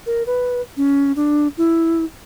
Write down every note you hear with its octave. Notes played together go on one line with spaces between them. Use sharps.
A#4
B4
C#4
D4
E4